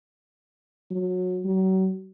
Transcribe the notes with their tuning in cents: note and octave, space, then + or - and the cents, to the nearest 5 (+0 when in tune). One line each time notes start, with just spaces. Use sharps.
F#3 -20
F#3 +35